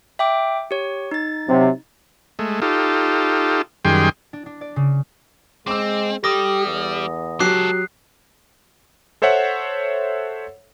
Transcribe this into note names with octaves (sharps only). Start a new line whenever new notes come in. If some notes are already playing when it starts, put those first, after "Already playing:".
E5 G5 D6
G4 C#5
D#4 A6
C3 F#3
G#3 A3
D#4 F4 G4 A4
F#2 D#3 G3 G#4 G5 C6
D4
D4
D5
C#3
G#3 C4 D6 E6
G3 G4 A4 D6 D#6 A#6
E2
F#3 G#3 G4 A4 D6 F#6 C7
A4 C5 C#5 E5 F#5